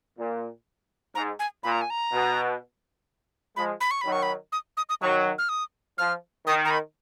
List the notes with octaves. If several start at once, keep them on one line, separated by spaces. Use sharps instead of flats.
A#2
G#2 A#5
G#5
A#2 B5
A#5
G#5
A#5
B2
F3 G#3 B5
B5
C#6
D#3 F#3 B5
C#6
B5
D#6
D#6
D#6
D#3 F#3 C#6
F6
D#6
F3 F6
D#3 D#6
A#5
B5